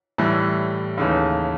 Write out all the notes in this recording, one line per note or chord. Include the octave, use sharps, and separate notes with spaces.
A2 E3 G3
D#2 C#3 E3 A3